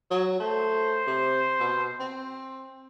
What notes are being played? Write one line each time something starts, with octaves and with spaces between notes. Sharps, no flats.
F#3
A3 C5
C3
B2
C4